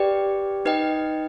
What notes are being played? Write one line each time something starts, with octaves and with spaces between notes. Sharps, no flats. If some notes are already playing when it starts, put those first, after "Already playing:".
Already playing: G4 B4 D5 G5
D#4 B4 D#5 G5